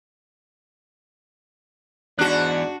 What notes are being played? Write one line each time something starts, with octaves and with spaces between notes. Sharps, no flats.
E2 G#2 D4 F#4 D5 F#6